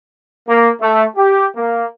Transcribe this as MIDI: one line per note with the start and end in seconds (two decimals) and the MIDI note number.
0.47 0.70 58
0.81 1.04 57
1.16 1.45 67
1.55 1.85 58